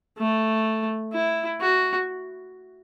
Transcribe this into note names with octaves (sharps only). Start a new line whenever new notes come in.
A3
E4
F#4